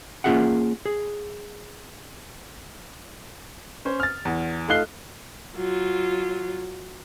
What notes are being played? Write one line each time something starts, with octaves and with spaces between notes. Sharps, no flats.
A#3 C#4 F4 G#4 E5 F#5
G#4
C#4 C5
F6 A6
E2
A3 D#4 F4 F#6 C7 G7
F#3 F4